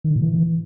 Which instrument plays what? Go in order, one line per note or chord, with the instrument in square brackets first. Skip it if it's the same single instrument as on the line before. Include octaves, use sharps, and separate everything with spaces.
[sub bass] D#3
D3
A#2
E3